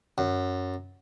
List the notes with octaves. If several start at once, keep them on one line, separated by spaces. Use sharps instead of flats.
F#2